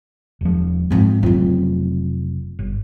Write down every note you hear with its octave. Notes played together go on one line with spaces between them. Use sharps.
E1 F3
G#2 F3 G#3 C4
F1 C#3 F#3 C4 F4
G1